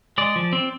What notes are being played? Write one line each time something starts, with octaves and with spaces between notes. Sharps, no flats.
G#3 D5
F3
C4